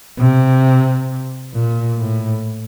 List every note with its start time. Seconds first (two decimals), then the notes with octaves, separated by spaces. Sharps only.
0.19 C3
1.53 A#2
1.98 A2